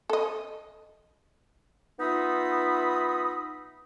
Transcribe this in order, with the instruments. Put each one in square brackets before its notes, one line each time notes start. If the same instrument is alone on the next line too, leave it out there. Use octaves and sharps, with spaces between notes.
[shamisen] A4 D#5
[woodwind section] B3 D#4 F4 E5 B5 D#6